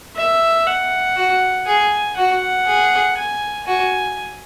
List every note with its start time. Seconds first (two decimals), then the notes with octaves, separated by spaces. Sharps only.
0.16 E5
0.67 F#5
1.17 F#4
1.66 G#4 G#5
2.17 F#4 F#5
2.67 G#4
3.18 G#5
3.67 F#4 G#5